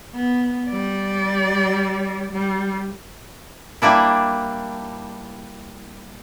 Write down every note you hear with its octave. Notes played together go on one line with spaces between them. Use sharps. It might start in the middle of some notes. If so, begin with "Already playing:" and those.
B3
G3 D5
G3
G3 A#3 D4 E4